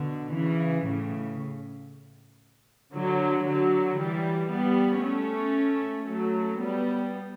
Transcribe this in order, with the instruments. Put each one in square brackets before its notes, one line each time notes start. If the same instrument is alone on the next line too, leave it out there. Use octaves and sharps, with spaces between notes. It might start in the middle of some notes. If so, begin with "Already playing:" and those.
Already playing: [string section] B2 D3
C#3 E3
A2 C#3
D3 F#3
D3 F#3
E3 G3
G3 B3
A3 C#4
F#3 A3
G3 B3